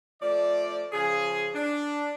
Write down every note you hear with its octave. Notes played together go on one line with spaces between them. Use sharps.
F3 A3 D5
C#3 F3 G#4
D4